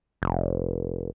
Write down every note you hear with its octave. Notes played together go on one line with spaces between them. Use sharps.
F1